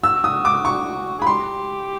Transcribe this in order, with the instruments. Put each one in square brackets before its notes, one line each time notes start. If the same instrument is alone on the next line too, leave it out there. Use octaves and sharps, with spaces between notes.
[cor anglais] F#4 [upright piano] E6
[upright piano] D#6
D6
C#6
[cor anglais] G#4 [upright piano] B5
[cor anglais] G4 [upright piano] C6